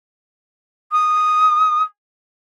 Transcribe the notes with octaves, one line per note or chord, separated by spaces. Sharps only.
D#6